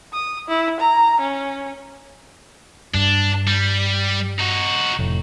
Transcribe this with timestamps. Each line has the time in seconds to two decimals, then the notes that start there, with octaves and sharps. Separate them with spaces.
0.13 D#6
0.48 E4
0.80 A#5
1.20 C#4
2.94 G2 D4
3.47 G3
4.39 D#4 F#4
4.99 F1 A2